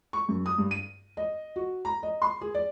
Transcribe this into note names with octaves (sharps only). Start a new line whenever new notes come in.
C#6
F#2
D#6
G2
D#7
D#5
F#4
A#5
D#5
C6
G#4
D5